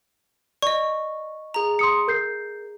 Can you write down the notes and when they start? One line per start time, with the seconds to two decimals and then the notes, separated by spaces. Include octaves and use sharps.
0.62 D5 D#5 C#6
1.54 G#4 A#5
1.79 C6 D#6 C#7
2.08 A#4 G6 C7